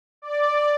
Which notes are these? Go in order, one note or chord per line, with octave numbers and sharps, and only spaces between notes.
D5